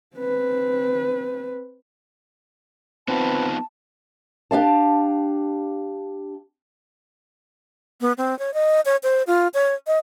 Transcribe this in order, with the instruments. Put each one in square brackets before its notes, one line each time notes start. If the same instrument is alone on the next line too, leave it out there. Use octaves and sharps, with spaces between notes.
[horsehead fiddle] C4 B4
[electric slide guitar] B3 D#4 F4 [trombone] C4 [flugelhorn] B4 [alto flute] A5
[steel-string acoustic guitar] D4 G4 F5 A5
[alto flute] B3
C4
C#5
D#5
C#5
C5
F4
C#5
D#5